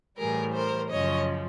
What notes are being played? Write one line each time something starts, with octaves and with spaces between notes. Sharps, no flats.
A2 E3 G3 G#4 A#4
A#4 C5
F#2 C#3 F3 C#5 D#5